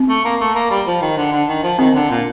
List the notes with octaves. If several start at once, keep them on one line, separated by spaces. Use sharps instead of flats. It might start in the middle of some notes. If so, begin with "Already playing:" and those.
Already playing: C4
A3
A#3
A3
A#3
G3
F3
D#3
D3
D3
D#3
F3
D#3 C4
D3
A#2